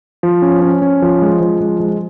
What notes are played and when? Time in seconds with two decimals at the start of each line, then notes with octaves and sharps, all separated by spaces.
0.23 F3
0.42 C#4
0.62 C#4
0.82 C#4
1.02 F3
1.22 G#3
1.41 F3
1.61 G#3
1.80 G#3